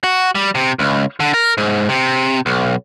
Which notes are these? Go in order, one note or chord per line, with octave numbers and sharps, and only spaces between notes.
F#4
G3
C3
C#2
D3
A#4
G#2
C3
B1